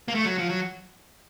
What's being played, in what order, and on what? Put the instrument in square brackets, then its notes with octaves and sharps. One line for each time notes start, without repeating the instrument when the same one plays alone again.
[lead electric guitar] A#3
A3
F#3
F3
F#3